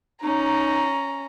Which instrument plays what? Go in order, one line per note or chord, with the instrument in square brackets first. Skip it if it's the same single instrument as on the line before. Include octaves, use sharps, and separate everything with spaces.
[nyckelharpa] C#4 [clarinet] D#4 [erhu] A#5